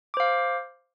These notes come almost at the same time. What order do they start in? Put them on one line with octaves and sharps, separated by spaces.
D6 C5 F5